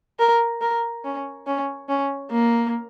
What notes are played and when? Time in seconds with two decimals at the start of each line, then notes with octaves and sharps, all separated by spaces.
0.19 A#4
0.61 A#4
1.04 C#4
1.47 C#4
1.89 C#4
2.31 A#3